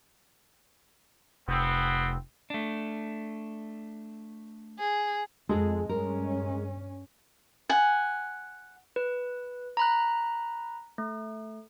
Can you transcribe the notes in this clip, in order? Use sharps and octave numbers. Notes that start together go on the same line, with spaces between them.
F1 B3 C4
A3 D4
G#4
F2 G#3 G#4 A4
G2 C#4 A#4
F#5 G#5
B4
A#5 B5 F#6
A3